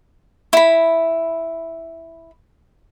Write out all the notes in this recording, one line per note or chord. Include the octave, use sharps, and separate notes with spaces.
E4 B5